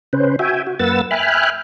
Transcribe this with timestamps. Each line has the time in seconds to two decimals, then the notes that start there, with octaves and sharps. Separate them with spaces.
0.13 C#3 C#4 B4 C5
0.39 F#4 E5 G5 G#5
0.67 F#4
0.79 F#2 A#3 B4 F#5 E6 A6
1.11 E5 G5 G#5 B5 F6 F#6